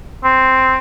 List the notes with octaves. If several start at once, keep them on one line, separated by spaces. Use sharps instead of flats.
C4